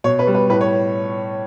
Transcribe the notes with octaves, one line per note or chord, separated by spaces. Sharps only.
B2 C#5
B4
G3
B4
A2 B4
C#5